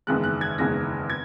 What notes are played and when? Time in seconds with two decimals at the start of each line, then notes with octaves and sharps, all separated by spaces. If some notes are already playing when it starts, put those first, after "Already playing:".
0.07 F#1 E2 D#3 G#3 F#6
0.24 F#6
0.41 G#6
0.58 F#1 E2 D#3 G#3 A#6
1.10 G#6